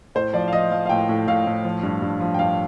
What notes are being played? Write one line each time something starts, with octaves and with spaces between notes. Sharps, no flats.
A2 C5
F3 D5
F5
F3 D#5
F3 F5
F5
A2 G5
A2
A2 F5
A2
F3
G2
G2
F3
G5
G2 F5